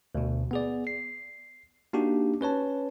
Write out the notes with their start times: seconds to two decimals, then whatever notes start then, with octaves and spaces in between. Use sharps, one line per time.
0.15 D2 B2
0.51 B3 G#4 D5
0.87 C7
1.93 A#3 D4 D#4 F#4 G4
2.41 C#4 B4 C#5 A5